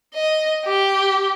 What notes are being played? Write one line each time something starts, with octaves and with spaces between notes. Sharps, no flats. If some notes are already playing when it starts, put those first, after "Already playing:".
D#5
G4